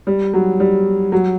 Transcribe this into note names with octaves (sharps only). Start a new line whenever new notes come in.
G3
F#3
G3
F#3